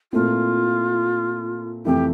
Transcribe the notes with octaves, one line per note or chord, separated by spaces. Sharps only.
A#2 A3 C4 E4 F4
F2 C3 E3 A3 E4 G4